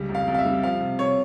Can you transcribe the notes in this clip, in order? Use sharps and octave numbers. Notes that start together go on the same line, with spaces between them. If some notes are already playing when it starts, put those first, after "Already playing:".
Already playing: C#2 G3
F2
F5
F2
F5
E5
G3
F3 F5
C3
C3 C#5